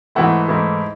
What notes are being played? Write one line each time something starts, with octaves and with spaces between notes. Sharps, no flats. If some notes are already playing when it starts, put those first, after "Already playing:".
G#2 E3 A3 E4 F#5
G#2 E3 A3 E4